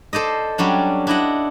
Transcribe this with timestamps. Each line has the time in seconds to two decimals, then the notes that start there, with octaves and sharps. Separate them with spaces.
0.13 A4 C5 D5 D#5
0.58 F#3 G3 C#4 D4
1.07 D4 E4 D#5 F#5